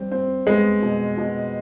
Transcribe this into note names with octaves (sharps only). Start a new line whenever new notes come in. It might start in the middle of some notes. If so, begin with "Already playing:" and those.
Already playing: G3 C4
C4
G#3 B3
B2
B2